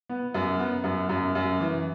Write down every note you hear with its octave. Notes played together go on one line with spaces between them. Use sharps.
B3
F#2
B3
F#2
F#2
F#2
E3